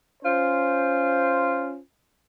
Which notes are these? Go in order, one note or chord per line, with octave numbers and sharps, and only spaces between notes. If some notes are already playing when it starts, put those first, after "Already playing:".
C#4 F4 C5